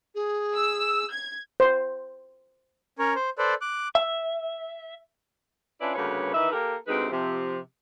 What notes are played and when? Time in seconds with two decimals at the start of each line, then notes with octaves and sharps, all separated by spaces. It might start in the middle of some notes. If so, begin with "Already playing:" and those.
0.15 G#4
0.55 E6
1.12 G#6
1.60 C5
2.99 C#4 A#4 C#5
3.16 C5
3.38 A4 B4 C5 D5
3.61 D6 F#6
3.95 E5
5.81 C#4 D4 E4 F4 B4 D5
5.96 D2 G2 C#3 A#3 B4 C#5
6.33 D#3 E3 D#4 B4 E5
6.52 A#3 G4 A4 A#4
6.88 D2 C3 G#3 C4 D#4 B4
7.11 C3 F3